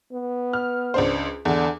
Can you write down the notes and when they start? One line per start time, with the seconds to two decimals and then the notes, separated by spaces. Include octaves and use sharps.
0.12 B3
0.53 F6
0.94 C#2 D4 C5
1.45 E2 D3